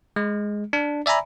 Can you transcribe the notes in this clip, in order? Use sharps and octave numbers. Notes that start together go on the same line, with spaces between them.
G#3
D4
D5 E5 G#5 A#5 B5